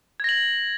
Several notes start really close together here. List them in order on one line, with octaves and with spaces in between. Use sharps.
G#6 A#6 F#7